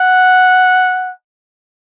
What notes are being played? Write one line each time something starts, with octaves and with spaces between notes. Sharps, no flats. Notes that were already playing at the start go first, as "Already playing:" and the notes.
Already playing: F#5